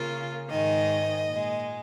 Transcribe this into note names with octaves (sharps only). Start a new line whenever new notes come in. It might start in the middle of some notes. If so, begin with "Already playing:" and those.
Already playing: C#3 A#3 F4
G#2 D#3 G#3 D#5
A#2 G#3